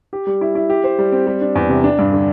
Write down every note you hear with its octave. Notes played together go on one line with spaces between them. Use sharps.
G4
G3
E4
E4
G4
C5
G3
C4
G3
D4
E2
C3
D4
G2
D3